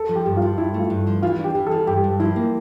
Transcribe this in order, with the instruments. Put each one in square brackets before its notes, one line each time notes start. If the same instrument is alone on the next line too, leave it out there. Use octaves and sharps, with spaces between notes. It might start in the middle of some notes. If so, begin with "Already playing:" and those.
Already playing: [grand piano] A4
[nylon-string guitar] F3
[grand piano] G4
[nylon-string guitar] G2
[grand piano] F4
[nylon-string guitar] F3
[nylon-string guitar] G2 [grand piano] E4
[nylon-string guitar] A3
[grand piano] F4
[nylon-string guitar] G2
F3
[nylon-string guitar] E3 [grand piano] F4
[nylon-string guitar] D4
[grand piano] G4
[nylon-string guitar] E3
[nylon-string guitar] E3 [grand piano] A4
[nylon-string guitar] G2 [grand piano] G4
[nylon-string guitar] G2
[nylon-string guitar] F3 [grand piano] E4
[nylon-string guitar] A#3